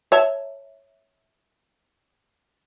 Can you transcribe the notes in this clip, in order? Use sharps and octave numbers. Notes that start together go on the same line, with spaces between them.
C#5 E5 A5